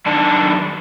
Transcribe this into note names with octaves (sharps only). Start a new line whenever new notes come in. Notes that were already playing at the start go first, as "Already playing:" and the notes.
F#2 D#3 D4 A5